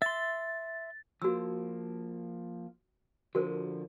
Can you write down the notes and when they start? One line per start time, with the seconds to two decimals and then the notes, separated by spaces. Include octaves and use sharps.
0.02 E5 C6 A6
1.22 F3 A#3 F#4 E6
3.35 D3 F3 F#4 A#4 C5